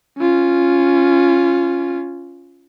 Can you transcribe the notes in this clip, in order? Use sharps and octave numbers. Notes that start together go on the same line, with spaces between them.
C#4 F4